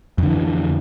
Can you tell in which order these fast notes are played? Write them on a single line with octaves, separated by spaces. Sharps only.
F2 D3 E3